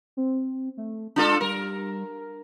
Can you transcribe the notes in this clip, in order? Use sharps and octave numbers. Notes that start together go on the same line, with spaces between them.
C4
A3
G#3 D4 F4 A4
G3 A#4